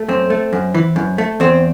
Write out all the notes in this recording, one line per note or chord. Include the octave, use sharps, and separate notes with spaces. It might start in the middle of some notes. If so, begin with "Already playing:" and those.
Already playing: A3
F#2 C4
A3
F#2
E3
F#2
A3
E2 C4